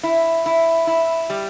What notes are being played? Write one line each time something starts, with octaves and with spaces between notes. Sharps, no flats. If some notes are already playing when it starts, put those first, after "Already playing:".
E4
E4
E4
G3